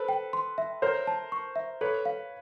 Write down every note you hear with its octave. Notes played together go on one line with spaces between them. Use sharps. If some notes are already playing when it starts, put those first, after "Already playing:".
Already playing: A4 B4 C5
G5
C6
E5
A#4 C5 C#5
A5
C#6
E5
A4 B4 C#5
F5